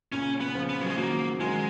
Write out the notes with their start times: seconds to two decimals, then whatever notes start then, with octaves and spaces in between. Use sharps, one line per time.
0.12 A#2 C#3 C#4
0.41 B3
0.55 C#3 F3
0.69 B3
0.81 F#3
0.89 G#3
0.97 D#3 F#3 A#3
1.40 D#3 F#3 G#3